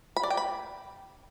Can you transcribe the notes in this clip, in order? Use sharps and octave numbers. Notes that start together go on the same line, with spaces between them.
B5
D5
G5
B5